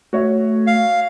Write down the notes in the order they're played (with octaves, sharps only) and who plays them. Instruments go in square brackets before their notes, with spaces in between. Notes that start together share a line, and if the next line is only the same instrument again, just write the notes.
[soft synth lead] A3 [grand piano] F#4 C#5 E5
[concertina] F5